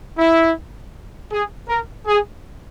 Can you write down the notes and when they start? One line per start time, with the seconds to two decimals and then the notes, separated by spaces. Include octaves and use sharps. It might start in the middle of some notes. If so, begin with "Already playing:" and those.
0.18 E4
1.32 G#4
1.68 A#4
2.07 G#4